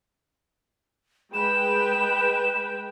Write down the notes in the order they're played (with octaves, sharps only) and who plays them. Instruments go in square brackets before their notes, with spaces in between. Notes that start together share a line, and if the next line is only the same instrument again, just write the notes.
[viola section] G#3 B4 G5 [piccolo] E7